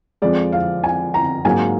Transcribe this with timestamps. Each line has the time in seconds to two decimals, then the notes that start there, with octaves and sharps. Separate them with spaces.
0.22 F2 F3 G#3 D5
0.52 F5
0.84 G#5
1.14 A#5
1.44 G#2 F#3 A#3 G#5